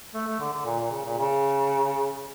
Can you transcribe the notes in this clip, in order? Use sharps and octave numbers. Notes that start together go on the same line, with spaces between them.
A3
A3
D3
D3
A#2
A#2
C#3
A#2
C#3